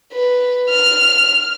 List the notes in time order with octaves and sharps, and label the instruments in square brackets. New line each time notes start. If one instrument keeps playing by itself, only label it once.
[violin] B4
F6